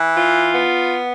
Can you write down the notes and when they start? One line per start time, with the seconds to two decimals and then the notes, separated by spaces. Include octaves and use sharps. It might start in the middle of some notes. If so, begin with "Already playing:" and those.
Already playing: E3
0.16 F4
0.53 B3